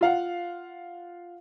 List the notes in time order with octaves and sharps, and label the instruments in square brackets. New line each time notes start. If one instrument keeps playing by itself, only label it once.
[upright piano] F4 F5 F#5